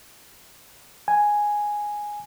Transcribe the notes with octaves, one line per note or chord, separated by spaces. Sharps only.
G#5